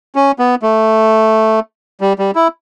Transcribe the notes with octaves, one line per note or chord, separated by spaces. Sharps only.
C#4
B3
A3
G3
G3
E4